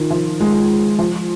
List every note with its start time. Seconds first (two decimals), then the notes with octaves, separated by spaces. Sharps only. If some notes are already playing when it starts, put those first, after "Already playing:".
Already playing: D#3 F3
0.10 F3
0.40 G#3
0.99 F3